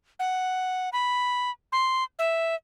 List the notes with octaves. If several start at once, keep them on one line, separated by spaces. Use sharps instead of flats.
F#5
B5
C6
E5